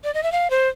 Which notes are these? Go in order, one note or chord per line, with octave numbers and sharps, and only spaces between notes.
D5
D#5
E5
F5
C5